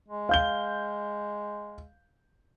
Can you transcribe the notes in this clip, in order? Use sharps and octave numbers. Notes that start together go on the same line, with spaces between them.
G#3
F5 G6 G7